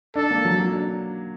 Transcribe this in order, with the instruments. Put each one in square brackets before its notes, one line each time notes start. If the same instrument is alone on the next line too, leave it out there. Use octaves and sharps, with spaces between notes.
[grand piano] D4 [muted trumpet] A4
[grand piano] A#3
F#3
F#3
D4